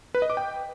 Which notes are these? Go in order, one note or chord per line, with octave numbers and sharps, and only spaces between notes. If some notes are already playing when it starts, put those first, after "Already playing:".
B4
D#5
D6
G5